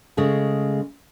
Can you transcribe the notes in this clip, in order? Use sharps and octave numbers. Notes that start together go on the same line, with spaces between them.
C#3 G#3 A3 G#4